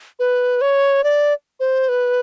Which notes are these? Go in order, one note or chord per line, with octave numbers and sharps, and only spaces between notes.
B4
C#5
D5
C5
B4